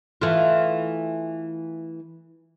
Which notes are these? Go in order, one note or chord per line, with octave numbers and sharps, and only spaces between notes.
E3 A3 F4